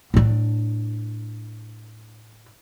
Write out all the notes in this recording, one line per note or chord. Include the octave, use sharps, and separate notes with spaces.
A2 D4